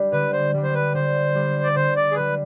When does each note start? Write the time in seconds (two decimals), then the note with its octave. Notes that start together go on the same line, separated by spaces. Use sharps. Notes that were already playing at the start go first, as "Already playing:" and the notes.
Already playing: G3 D4
0.12 D3 B4
0.33 C5
0.54 G3 D4
0.63 C5
0.74 B4
0.95 D3 C5
1.35 G3 D4
1.63 D5
1.76 D3 C5
1.97 D5
2.11 G#4
2.16 G3 D4 B4